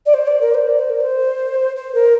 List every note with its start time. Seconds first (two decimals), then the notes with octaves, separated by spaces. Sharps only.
0.06 D5
0.14 C5
0.27 D5
0.41 A#4
0.55 C5
0.68 D5
0.79 C5
0.90 A#4
1.01 C5
1.76 C5
1.95 A#4